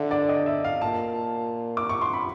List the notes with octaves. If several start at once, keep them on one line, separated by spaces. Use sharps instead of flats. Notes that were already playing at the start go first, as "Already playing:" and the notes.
Already playing: D3 E5
D5
D#5
E5
F5
A#2 A5
D6
C#6
C6
B5